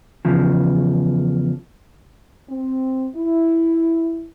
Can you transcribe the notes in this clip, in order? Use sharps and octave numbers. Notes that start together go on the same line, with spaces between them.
E2 C#3 F3
C4
E4